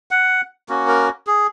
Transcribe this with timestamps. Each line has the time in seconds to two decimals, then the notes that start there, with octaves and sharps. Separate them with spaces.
0.11 F#5
0.69 A#3 C#4 F#4
0.88 A#4
1.27 G#4